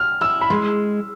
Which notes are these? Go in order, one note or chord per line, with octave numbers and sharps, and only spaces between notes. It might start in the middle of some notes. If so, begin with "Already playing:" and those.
Already playing: F6
E4 E6
B5
G#3 C6